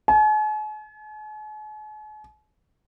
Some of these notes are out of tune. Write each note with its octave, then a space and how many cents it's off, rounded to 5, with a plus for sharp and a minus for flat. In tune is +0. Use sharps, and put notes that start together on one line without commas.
G#5 +45